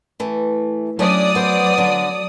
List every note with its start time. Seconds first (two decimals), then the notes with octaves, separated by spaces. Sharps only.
0.20 E3 A3
0.99 F#3 A3 C#4 D4 D5 D#6
1.35 B3 C5
1.78 D3